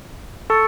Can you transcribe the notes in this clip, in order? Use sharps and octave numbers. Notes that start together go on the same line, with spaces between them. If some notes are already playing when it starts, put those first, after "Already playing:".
A4 C#6 E6 A6 C#7